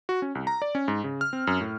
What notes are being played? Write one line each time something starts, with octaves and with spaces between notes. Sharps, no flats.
F#4
C#4
C2
A#5
D5
C#4
G#2
C#3
F6
C4
F#2
A2